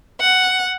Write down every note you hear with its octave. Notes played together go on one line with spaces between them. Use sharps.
F#5